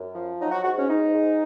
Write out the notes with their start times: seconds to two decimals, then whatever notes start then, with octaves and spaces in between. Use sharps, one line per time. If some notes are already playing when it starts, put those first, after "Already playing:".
Already playing: F#2
0.15 F3
0.39 F#3 D#4
0.51 F#4
0.64 G#2 F#4
0.77 C#4
0.89 G#2 D#4
1.14 G#2